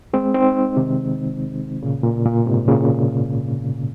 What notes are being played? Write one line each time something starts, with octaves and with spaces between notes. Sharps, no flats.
G#3 C4
C4 D#4
C3 D#3
A#2 C#3
A#2
A#2
G#2 C3
A#2 C#3